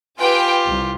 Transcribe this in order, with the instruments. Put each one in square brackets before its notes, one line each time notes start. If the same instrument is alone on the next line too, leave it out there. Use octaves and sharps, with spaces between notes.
[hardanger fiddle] F4 G4 [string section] B4 G5 G#5
[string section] C2